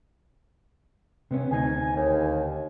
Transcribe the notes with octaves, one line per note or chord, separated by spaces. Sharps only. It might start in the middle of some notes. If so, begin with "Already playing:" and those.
C3 B3 C#4
D2 D#4 G#5
D#2